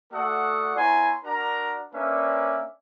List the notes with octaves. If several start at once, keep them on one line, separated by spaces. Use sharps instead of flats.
A3 F#4 A4 D5 F#5 D#6
B3 E4 C#5 G#5 A#5 C6
D4 F#4 A#4 A#5
A#3 C#4 D4 B4 D5 E5